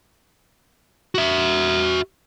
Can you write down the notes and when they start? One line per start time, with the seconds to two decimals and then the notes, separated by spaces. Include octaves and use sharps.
1.15 F#4 E5